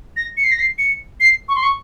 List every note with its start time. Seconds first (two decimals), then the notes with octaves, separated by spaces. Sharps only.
0.16 A#6
0.37 C#7
0.44 C7
0.51 A#6
0.59 C7
0.78 C#7
1.20 C7
1.48 C#6
1.55 C6
1.63 C#6